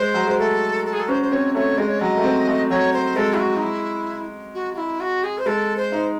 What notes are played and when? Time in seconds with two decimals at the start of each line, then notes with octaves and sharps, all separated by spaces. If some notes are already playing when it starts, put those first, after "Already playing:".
Already playing: G#3 C5
0.14 F#3
0.27 G#3
0.39 A3 A4
0.86 A4
0.93 G#4
1.00 A4
1.09 C#4 C5
1.22 C5
1.31 C4 C#5
1.54 A3 C#5
1.78 G#3 D#5
1.88 C#5
1.99 F#3 D#5
2.17 A3
2.24 C4
2.47 A3
2.70 F#3 C#5
2.93 C5
3.16 G#3 A4
3.34 E4
3.39 F#4
3.56 D#4
3.62 E4
4.54 F#4
4.73 F#4
4.77 E4
5.00 F#4
5.24 G#4
5.38 C5
5.46 G#3 A4
5.77 C5
5.92 D#4